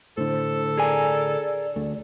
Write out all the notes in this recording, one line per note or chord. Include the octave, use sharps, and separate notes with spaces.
A2 D3 A4 C5
G#4 A#4 D5 G#5
D2 A3